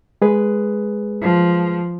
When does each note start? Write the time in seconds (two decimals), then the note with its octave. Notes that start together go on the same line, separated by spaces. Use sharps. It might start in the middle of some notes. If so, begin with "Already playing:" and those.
0.22 G#3 G#4 B4
1.22 F3